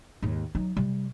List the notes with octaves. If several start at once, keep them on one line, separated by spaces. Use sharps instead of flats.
D#2 G#2
F#3 D#4
C3 G3